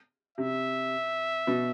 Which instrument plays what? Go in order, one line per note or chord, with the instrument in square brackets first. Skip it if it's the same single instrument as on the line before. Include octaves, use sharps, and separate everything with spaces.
[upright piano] C3 [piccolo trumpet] E5
[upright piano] B2